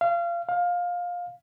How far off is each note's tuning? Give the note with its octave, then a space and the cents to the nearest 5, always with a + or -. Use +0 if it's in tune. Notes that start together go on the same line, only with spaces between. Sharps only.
F5 -25
F5 +20